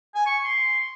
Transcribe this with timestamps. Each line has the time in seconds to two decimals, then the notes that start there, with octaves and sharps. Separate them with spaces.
0.15 G#5
0.26 C#6
0.44 C6